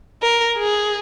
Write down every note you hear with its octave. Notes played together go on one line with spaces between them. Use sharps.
A#4
G#4